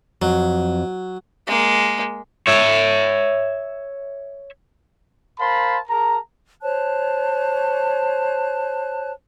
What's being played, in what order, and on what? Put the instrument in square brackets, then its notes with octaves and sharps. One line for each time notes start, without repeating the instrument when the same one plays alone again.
[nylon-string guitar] F2 [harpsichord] F#3
[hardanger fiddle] G#3 A#3
[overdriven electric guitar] C#5 E5
[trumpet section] A#4 C5 F5 A5 B5 C6
G#4 A#4 A5 A#5
[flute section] C5 C#5 A5 F#6